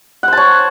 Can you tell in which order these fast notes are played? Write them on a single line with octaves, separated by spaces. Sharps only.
F#5 C5 A5 C#5